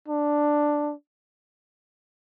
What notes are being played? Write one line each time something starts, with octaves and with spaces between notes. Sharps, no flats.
D4